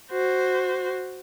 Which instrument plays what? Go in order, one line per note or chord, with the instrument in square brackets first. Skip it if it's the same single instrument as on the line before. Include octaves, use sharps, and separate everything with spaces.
[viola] F#4 C5